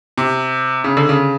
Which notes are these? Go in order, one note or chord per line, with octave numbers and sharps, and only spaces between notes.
C3
C#3
D3
C#3